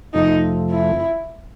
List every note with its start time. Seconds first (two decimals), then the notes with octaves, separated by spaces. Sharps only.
0.14 F2 C3 F3 A3 D#4
0.70 E4